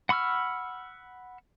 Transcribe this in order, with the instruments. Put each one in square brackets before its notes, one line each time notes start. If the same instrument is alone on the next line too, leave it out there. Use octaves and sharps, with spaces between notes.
[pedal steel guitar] F#5 B5 C#6 E6 F6